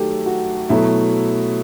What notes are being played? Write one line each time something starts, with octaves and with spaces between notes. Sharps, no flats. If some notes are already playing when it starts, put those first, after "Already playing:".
Already playing: D#3 F#3 A3 G4 A4
F#4
B2 F#3 A3 E4